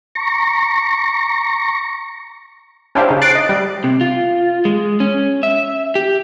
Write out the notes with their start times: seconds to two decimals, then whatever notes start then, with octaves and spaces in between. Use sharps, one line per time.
0.15 A#5 C#6
2.95 C#4 D4 E4 G4 C5 F5
3.08 C#3 D#4
3.22 F#6 A6 C7 D7
3.35 D#5
3.49 G3
3.84 C3
4.01 F4
4.65 G#3
5.00 C#4
5.43 E5
5.95 G4